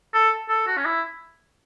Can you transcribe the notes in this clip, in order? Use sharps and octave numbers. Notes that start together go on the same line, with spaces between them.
A4
A4
F#4
C#4
E4